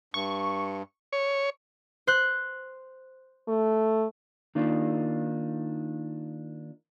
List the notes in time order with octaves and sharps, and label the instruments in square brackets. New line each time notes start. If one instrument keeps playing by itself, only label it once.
[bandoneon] G2 [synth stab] C#6
[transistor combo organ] C#5
[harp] C5 F#6
[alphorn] A3
[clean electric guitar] D#3 A#3 D4 D#4 F4